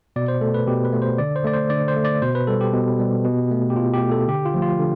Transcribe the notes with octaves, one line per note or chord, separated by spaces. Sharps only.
B2 D5
C5
A3 A4
B4
B2 G4
B4
A3
C5
D3 D5
C5
A3 D5
C5
D3 D5
C5
A3
D5
B2 C5
B4
G3 A4
G4
B2
G3
B2
A3
G4
B2 F4
G4
A3
A4
D3 G4
F4
F3 A3
F4
D3